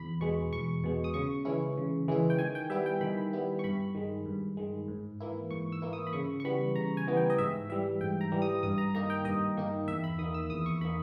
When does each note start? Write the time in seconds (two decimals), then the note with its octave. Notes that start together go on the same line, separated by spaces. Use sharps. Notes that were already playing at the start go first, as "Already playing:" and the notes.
Already playing: E2 B5
0.21 B2 G#3 C#6
0.52 E2 C#6
0.84 B2 G#3
1.04 D#6
1.14 C#3 C#6
1.45 E3 G#3 C#4 E4
1.77 C#3
2.08 E3 G#3 C#4 E4
2.30 G5
2.39 D#3 G#5
2.55 G5
2.70 G3 B3 E4 E5
2.86 G5
3.01 D#3 B5
3.18 B5
3.33 G3 B3 E4
3.59 C#6
3.64 G2 B5
3.95 D#3 G#3
4.26 G2
4.57 D#3 G#3
4.88 G#2
5.20 E3 A#3 E4
5.51 G#2 C#6
5.72 E6
5.82 E3 A#3 E4
5.93 D#6
6.07 B5
6.13 C#3 C#6
6.40 C#6
6.44 E3 G3 B3 B5
6.75 C#3 A#5
6.97 G#5
7.07 E3 G3 B3
7.17 G5
7.30 D#5
7.38 G#2 E5
7.69 E3 G3 E5
8.01 G#2 G5
8.21 A#5
8.32 E3 G3
8.42 D#6
8.63 G2 D#6
8.78 A#5
8.94 D#3 A#3 D#4 A#5
9.10 G5
9.25 G2 D#5
9.57 D#3 A#3 D#4
9.88 E2 E5
10.04 B5
10.18 D#3 A#3 D#6
10.34 E6
10.50 E2 D#6
10.66 C#6
10.81 D#3 A#3 B5